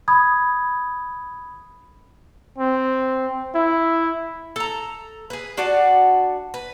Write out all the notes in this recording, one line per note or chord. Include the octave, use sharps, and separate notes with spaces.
B5 D#6 G#6
C4
E4
A4 A#5
G#4 B4
D4 F#4 D5 F#5
B4